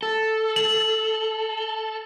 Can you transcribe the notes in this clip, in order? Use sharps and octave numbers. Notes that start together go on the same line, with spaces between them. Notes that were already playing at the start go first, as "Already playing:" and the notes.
A4
F#7